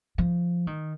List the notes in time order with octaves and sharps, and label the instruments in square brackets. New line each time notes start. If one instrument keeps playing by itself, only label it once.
[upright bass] F3
D#3